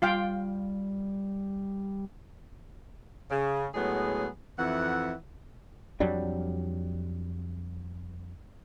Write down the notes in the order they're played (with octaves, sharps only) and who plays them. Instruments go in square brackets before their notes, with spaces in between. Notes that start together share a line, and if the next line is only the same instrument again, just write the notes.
[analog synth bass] G3 [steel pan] F4 F5 G5
[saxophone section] C#3
A2 F#3 G#3 B3 G#4
F2 E3 E5 F#5
[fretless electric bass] F2 F#3 G3 D4